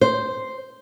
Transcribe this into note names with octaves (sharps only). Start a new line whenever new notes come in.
C5